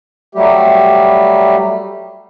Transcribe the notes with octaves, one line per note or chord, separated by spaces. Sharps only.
F#3 G3 A3 G4